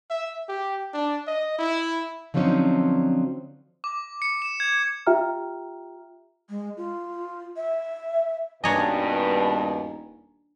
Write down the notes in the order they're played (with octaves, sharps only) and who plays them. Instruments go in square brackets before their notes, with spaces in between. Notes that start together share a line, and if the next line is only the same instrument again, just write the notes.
[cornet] E5
G4
D4
D#5
E4
[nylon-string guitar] D3 F3 F#3 C4 C#4 D#4
[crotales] D6
C#7
E7
G#6
[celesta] F4 G4 E5 G5 A#5 F6
[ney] G#3
F4
E5
[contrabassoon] D#1 [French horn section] G2 B2 [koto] D4 C#5 D#5 [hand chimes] G#5 A#5